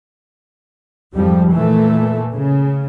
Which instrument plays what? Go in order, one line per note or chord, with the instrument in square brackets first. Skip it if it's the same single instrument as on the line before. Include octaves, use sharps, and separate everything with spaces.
[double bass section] F2 G#2 F3 G3
A#2 E3 A3
C#3